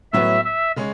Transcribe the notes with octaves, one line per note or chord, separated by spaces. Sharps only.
A2 F#3 B3 E5
E5
C#3 G#3 C#4